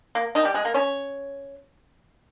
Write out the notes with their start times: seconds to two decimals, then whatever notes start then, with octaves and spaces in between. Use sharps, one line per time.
0.15 A#3
0.35 D#3 D#4
0.45 G3 G4
0.54 G#3 G#4
0.65 A#3 A#4
0.74 C#4 C#5